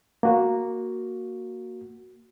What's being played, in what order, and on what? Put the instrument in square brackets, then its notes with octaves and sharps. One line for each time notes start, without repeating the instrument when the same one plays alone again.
[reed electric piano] A#3 F#4